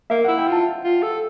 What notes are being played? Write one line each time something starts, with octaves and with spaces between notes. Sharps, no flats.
A#3 E5
E4 F#5
G5
F4 A5
F4
A4